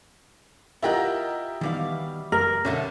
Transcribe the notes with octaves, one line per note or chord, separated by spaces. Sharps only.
E4 F4 G4 A#4 D#5 F#5
B2 D#3 E3 G3 B3 F5
F#1 A#4
B1 D3 A3 C#4 A4